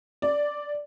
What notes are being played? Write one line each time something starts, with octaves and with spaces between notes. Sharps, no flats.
D5